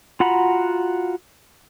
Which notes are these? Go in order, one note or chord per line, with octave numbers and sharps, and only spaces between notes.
F4 F#4 F#5 A#5 B5